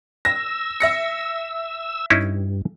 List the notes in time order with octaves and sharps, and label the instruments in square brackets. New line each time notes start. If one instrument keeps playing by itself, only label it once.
[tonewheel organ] E6 [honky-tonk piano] A#6
[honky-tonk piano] E5 A#6 C#7
[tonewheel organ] G2 [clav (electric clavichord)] C#4 D#4 E4